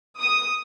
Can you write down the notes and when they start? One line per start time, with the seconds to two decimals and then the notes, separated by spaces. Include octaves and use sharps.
0.20 D#6